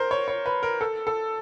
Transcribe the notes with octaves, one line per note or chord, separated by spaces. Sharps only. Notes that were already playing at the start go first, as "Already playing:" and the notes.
Already playing: A#4 C5
C#5
C#5
B4
A#4
A4
A4